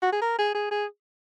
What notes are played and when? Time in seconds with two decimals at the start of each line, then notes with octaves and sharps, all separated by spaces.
0.03 F#4
0.12 G#4
0.22 A#4
0.39 G#4
0.55 G#4
0.71 G#4